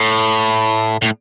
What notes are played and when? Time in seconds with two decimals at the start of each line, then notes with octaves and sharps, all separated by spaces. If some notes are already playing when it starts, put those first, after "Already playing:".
Already playing: A2
1.02 A2